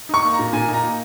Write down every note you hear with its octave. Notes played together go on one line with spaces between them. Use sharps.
D#4 C#6
A#3
A#5
A#2
A#2 G#5
D#4
A#5
A#3